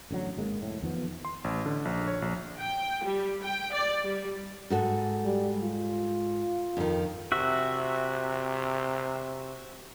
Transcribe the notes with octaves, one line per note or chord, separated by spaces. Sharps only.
A1 D3 D#3 F#3
G#1 G#3 A#3
F1 A2
E2 D#3 F3 B3
C6
A1
D3
A#1
C#5
A#1
G5
G3
G5
D5
G3
G#2 F#4 A4
G3
F4
F2 D#3
C3 F#4 E5